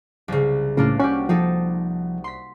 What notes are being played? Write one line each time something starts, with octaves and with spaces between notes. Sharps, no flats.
C2 C#3
A2 C#3 A#3 D4 F4
C#4 F#4 G4
F3 C4 D#4 A4
C6 B6